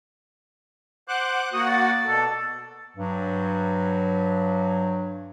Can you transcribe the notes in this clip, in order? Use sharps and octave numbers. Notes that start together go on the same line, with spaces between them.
C5 F#5 D6 F#6
A#3 F#4 F#5 D#6
D5
B2 A4
G2 F#3